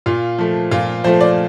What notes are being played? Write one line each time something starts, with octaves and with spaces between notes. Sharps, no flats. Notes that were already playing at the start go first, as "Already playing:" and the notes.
A#2 F4
F3 A3
A#2 F4
F3 A3 C5
D5